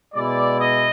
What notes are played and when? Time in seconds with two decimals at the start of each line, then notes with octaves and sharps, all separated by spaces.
0.14 B2 G#3 B3 E4 D5
0.61 D#5